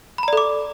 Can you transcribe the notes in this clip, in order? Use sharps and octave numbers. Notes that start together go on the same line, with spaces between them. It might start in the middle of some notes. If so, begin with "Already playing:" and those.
A4 D5 A#5 B5 D6